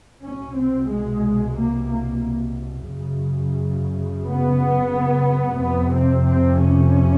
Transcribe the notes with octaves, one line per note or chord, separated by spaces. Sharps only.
C2 B2 C#4
C4
G#3
A#3
A#3
F#2 C#3
B3
F2 C3 B3
C4
C4
C#4